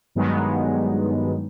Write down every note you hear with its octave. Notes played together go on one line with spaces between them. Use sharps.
G2 D#3 F#3 G#3 B3 D#4